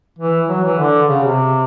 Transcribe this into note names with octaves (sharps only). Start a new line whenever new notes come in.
E3
F#3
E3
D3
C#3
C3